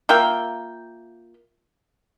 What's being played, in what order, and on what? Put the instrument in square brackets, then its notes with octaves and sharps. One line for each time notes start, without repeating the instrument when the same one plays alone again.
[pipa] A#3 F4 E5 G5